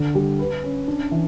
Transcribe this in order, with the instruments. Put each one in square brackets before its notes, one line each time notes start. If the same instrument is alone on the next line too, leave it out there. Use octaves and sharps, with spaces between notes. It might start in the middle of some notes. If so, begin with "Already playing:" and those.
Already playing: [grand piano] D3
G3
B4
C#4
D4
E3